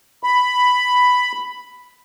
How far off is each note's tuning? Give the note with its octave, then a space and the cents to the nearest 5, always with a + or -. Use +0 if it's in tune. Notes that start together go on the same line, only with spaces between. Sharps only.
B5 +5